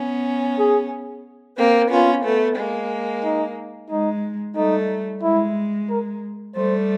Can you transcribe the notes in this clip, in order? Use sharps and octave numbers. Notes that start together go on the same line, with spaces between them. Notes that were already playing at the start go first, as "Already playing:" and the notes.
Already playing: B3 C#4
G#4
A#3 C4
B3 C#4 F4
A3 B3
G#3 A#3
D#4
G#3 D#4
G3 A3 D#4
G#3 E4
A#4
G3 A3 C5